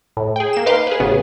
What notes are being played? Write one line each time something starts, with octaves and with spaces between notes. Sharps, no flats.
A2
G#4 G5
A#3 E7
D#4 B4 F5 C6 D6
G#4 B4
A1 C#3 B3